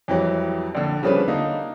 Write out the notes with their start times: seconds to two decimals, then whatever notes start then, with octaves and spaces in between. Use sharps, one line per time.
0.08 F2 E3 F#3 G3
0.75 A#1 D3
1.03 C#3 F3 G3 C#4 D4 B4
1.28 D3 A#3 D#4